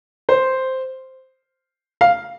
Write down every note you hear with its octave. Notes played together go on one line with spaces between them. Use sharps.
C5
F5